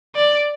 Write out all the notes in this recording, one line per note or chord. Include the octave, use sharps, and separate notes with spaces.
D5